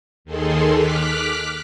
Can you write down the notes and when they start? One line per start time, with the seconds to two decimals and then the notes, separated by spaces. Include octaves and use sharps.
0.25 D#2 D#3 G#4 A4 C6
0.73 D6 F6 F#6 B6